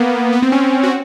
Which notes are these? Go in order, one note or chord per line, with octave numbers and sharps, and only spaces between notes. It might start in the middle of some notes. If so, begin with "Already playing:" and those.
Already playing: A#3 B3
B3
C4
C#4
F#4